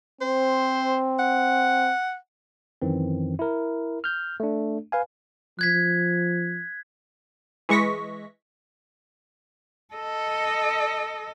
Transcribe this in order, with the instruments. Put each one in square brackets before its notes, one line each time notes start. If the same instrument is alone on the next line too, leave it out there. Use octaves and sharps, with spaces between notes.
[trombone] C4 [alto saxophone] C5
[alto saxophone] F#5
[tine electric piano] F#2 D#3 E3 C4
E4 A#4
F6 G6
A3 D4
B4 F5 G#5
[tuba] F3 [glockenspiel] F#6 G#6 B6
[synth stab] E3 G#3 C#6 A#6 B6
[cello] A4 D#5